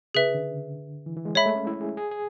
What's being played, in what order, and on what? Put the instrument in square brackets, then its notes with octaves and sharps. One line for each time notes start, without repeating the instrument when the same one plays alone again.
[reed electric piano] C#3 [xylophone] G#4 B4 E5
[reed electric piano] D3
E3
E3
G#3
[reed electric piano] G#3 [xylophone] C#5 E5 B5
[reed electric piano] A3
C#4
E4
G#4
G#4
G#4